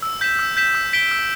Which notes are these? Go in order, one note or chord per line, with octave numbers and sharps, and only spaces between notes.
E6
G6 B6 E7
E6
G6 B6 E7
E6
B6 D7 G7
E6